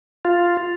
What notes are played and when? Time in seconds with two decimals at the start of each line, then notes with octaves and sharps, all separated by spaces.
0.25 F4